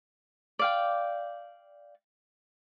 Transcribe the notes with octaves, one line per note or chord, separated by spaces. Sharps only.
D5 F5 G5